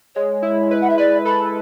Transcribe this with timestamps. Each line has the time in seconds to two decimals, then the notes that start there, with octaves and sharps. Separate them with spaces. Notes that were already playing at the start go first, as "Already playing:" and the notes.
0.15 G#3 C#5
0.42 E4
0.71 B4
0.81 F#5
0.90 E5
0.98 B4 D5
1.25 A4 B5